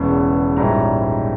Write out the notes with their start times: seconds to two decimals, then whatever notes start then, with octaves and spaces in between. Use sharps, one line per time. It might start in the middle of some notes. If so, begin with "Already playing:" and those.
Already playing: E1 E2 C#3
0.57 A#1 G#2 G3 C#4 E4 A#5